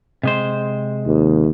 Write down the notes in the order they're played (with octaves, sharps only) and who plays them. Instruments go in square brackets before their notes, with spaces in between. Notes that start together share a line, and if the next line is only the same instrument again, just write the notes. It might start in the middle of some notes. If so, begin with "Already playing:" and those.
[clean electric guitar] C3 G#3 C5
[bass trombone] D#2